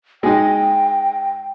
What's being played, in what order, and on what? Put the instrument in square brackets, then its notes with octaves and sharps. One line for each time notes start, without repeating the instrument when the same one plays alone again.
[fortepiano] G#3 D#4 [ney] G5